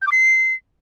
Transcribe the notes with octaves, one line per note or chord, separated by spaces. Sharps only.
G6
D6
C7